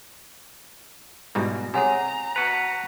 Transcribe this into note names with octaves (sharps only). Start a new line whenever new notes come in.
G#2 B2 G3 E4 E5
C3 G#4 C#5 F#5 G#5 A#5
F#4 B4